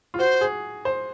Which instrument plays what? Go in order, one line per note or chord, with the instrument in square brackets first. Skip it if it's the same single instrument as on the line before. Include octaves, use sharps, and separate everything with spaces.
[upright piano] F4
[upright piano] F#4 [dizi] C5
[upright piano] G#4
C5